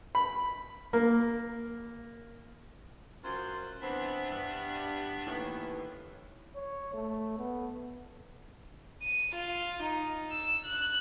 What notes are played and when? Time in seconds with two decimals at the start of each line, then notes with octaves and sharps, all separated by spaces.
0.15 B5
0.93 A#3
3.24 F#2 F4 C5 F#6
3.81 E3 B3 C4 D4 E5
4.29 G2
5.25 D#2 A2 E3
6.55 C#5
6.94 A3
7.38 B3
9.02 D#7
9.35 F4
9.83 D#4
10.32 E6
10.65 F#6